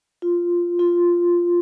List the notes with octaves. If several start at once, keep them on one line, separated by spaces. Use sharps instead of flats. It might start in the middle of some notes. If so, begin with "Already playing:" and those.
F4
F4